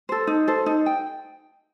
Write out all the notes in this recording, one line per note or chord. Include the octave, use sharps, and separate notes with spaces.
A4 C5
D#4
A4 C5
D#4
G5